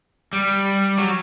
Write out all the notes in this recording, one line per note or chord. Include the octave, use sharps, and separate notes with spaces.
G3
F#3